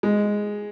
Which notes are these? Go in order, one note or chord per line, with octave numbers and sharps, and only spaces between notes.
G#3